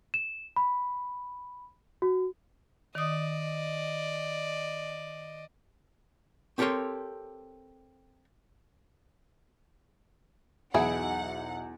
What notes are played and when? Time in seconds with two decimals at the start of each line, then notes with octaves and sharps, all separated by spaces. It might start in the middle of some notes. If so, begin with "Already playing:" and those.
0.14 E7
0.56 B5
2.02 F#4
2.95 D#3 D5 D#5 D#6
6.58 C4 G4 A4 A#4 C#5 C6
10.74 B1 E2 E4 G#4 E5 F#5 D7